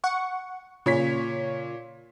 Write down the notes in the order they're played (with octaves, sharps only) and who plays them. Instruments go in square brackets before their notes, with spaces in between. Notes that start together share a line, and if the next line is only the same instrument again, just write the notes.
[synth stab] F#5 C#6
[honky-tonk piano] A#2 C#5 B6 [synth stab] C#3